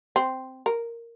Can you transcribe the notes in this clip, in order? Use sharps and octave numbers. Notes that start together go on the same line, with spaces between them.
C4
A#4